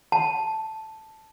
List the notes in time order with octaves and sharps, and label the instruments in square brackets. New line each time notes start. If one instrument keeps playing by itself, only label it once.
[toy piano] A5